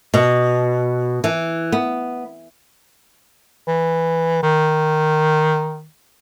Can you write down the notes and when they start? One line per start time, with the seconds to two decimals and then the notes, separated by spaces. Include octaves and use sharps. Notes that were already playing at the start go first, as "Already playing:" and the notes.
0.14 B2
1.24 E3
1.72 B3
3.67 E3
4.43 D#3